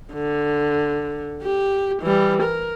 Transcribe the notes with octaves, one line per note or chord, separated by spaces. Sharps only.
D3
G4
E3 G3
A#4